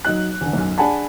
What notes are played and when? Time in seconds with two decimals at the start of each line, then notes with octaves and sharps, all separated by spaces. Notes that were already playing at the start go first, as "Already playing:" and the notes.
0.05 F#3 D#4 F#6
0.41 E2 D3
0.53 B1 F#2
0.78 D4 G#4 F#5 G#5 A5 B5